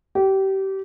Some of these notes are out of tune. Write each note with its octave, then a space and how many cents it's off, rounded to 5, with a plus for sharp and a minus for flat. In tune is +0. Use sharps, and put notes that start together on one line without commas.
G4 -25